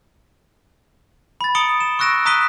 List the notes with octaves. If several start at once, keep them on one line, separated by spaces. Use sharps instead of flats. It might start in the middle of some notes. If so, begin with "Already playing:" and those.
B5 A6
A#5 D#6 C#7 D7 G7
E7
C#6 E6 F#6 A#6 D7 E7
A#5 D#6 F#6 B6 D#7 G7